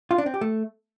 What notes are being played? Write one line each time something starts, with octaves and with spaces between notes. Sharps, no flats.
F4
D4
C4
G4
A3